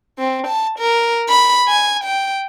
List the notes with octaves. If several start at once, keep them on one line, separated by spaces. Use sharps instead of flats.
C4
A5
A#4
B5
G#5
G5